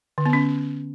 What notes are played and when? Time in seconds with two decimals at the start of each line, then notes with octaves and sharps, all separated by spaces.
0.18 D3
0.25 B3
0.33 C#4